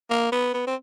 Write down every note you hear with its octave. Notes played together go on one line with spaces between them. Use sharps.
A#3
B3
B3
C4